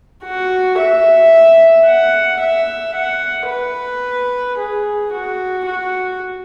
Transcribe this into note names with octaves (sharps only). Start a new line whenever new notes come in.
F#4
E5
F#5
E5
F#5
B4
G#4
F#4
F#4